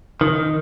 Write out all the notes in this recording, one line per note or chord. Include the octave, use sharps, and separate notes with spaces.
D#3